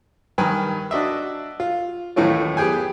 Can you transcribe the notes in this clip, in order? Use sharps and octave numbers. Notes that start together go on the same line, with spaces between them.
G2 D#3 B4 G#5
D4 F#4 D#5 E5
F4
D#2 A2 E3 A3 C#4 F4
B3 G4 G#4 G5 G#5